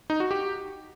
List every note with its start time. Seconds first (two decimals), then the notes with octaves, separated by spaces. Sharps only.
0.10 D#4
0.20 F#4
0.31 G4